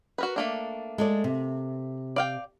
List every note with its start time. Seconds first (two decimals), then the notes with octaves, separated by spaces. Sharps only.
0.18 F#4 A#4 B4
0.36 A3 A#3 D4
0.98 G#3 A4 D5
1.24 C3
2.16 D5 F5 G5